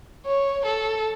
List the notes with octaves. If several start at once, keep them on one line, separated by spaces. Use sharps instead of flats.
C#5
A4